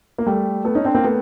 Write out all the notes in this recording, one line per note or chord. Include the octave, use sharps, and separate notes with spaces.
A#3
G3 A3
A3 B3
C#4 D#4
C4 D4
A#3 C4
A3 B3